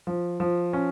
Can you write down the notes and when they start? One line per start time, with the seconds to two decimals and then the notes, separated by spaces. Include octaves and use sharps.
0.07 F3
0.40 F3
0.73 C#4